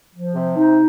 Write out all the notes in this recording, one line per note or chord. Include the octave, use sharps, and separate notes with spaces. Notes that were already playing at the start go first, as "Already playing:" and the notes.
F3
C3
D#4